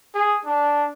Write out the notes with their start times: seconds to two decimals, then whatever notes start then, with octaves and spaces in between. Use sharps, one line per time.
0.14 G#4
0.45 D4